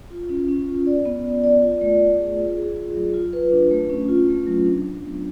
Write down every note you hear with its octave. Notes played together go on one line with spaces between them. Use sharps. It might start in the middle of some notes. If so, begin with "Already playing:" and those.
F4
C#4
C#4
F4
D5
B3
D5
D5
F4
A3
A3
G#4
F4
G#4
F4
F#3
F4
B4
D4
A3
C#4
F4
A3
F#3
D4
F#3
B3